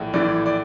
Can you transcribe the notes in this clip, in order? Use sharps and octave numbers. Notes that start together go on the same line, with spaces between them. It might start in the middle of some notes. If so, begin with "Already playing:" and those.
Already playing: A#1 A2 E3
A#1 A2 E3 D5
D5